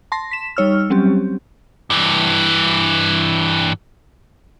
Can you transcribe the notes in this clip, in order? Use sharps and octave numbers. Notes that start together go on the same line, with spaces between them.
A5 C6 A#6
B6 E7
G3 D#4 C#5 E6 F6
F#3 G3 C4 C#4 G4
G2 E3